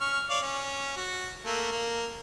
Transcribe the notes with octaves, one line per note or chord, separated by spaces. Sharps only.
C#4 C#6 F6
C#5 D5 F5
C#4
F#4
A3 A#3
A#3